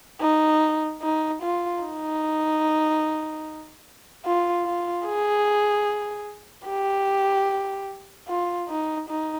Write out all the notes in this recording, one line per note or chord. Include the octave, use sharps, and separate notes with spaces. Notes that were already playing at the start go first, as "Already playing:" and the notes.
D#4
D#4
F4
D#4
F4
F4
G#4
G4
F4
D#4
D#4